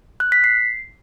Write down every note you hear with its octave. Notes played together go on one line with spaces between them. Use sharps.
F#6
B6
C7